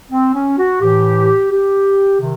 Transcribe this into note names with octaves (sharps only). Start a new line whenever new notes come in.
C4
C#4
F#4
A2 E3 G4
G4
C3 D#3